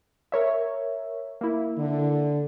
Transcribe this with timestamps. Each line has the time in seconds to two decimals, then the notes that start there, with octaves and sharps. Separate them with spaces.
0.32 A#4 C#5 E5
1.41 A#3 E4
1.77 D3